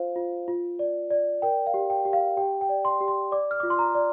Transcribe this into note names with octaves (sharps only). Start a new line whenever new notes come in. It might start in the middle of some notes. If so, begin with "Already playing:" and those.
Already playing: F4 C5 F5
F4
F4
D5
D5
A#4 G5
F5
G4
G5
G4
F5
G4 G5
G5
D5
C6
G4
C6
D5 D6
F6
F4 D6
C6
A#5
D5